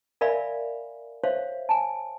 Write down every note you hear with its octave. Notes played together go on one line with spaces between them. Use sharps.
A#4 D5 E5 F5 G#5 B5
C5 C#5 E5 F5
G#5 A5